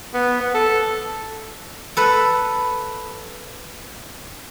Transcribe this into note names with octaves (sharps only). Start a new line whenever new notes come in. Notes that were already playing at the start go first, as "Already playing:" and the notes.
B3
B3
A4
A4 B4